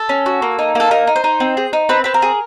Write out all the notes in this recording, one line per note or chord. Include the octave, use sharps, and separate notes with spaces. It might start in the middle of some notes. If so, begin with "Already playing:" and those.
Already playing: A4
C#4
F#4
A#3
D#4
A#3 A4
D#4 A#4
D#4
C5
D#4
C4
G#4
D#4
C4 B4
C4 B4
A#4
G#4